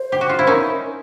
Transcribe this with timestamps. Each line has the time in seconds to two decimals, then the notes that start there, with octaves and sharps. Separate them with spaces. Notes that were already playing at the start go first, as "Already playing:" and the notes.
Already playing: C5
0.12 G4
0.21 F#4
0.29 F4
0.39 E4
0.47 C#4 D#4 A#4